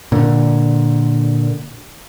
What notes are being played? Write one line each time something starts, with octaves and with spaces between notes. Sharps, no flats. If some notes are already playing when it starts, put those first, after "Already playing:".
A#2 D3